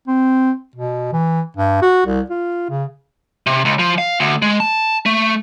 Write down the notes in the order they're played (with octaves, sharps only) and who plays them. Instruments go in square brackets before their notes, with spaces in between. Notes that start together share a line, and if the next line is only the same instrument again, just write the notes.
[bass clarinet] C4
B2
E3
G2
F#4
C2
F4
C#3
[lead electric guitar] C3
C#2
F3
F5
D2
G#3
A5
A3